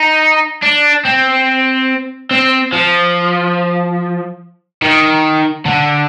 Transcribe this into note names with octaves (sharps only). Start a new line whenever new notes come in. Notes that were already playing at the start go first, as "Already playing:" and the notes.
Already playing: D#4
D4
C4
C4
F3
D#3
D3